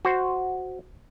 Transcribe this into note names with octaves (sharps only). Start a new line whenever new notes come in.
F#4 C5